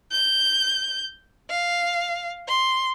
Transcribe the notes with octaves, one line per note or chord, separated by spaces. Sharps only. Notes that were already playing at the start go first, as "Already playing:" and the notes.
G6
F5
C6